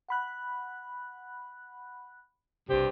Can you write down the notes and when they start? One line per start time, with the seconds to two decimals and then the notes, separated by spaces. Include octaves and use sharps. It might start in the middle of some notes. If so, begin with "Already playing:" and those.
0.09 F#5 B5 F#6
2.69 B1 G2 C3 G4 C5